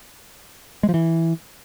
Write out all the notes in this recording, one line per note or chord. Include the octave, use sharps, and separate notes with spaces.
G#3
F3
E3